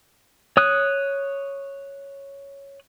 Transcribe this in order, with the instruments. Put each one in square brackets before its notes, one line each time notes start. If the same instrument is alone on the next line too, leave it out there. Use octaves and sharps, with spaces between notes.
[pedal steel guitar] C#5 D#6 F#6